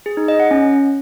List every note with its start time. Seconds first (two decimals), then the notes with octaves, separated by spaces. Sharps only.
0.06 G#4
0.17 D#4
0.28 D#5
0.40 F#5
0.51 C#4